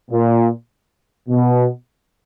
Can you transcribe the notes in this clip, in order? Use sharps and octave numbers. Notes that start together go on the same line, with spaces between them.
A#2
B2